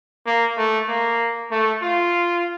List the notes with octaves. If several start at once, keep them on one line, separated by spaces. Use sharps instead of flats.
A#3
A3
A#3
A3
F4